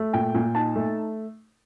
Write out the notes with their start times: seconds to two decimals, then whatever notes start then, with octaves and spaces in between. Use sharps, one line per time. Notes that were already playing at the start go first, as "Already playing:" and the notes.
Already playing: A3
0.13 A#2 G5
0.35 A#2
0.55 D#4 A5
0.76 A3